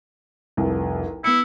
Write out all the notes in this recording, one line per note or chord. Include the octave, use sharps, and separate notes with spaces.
F1 C2
B3 E4 C#7